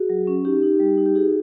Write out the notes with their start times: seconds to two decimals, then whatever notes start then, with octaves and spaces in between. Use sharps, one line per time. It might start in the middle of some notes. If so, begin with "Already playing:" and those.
Already playing: F#4 G#4
0.09 F#3
0.27 C#4
0.45 D#4 G4
0.62 D#4
0.80 G3
0.98 D#4
1.06 G4
1.15 D#4 F#4 G#4